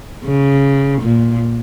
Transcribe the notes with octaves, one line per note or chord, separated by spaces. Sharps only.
C#3
A#2